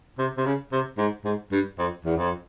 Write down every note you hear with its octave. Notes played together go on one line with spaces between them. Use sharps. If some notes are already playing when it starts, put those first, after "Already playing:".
C3
C3
C#3
C3
G#2
G#2
G2
F2
E2
F2